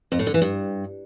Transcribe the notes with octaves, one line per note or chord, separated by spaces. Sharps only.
F2
A2
D3
E3
G2